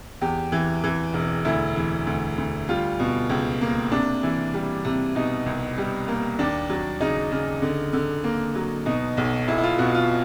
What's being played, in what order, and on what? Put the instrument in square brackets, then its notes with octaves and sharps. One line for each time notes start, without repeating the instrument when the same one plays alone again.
[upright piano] E2 G4
E3
E3
E1
D2 E4
E3
D2
D2
G3 F4
B2
C#2
A#3
C3 D4
E3
G3
C3
B2 D#4
C2
G3
A#3
D#2 D4
F#3
C#3 D#4
C#3
D3
D3
A#3
F#3
B2 D#4
B1
B1 E4
E4
F4
B2 F#4
F4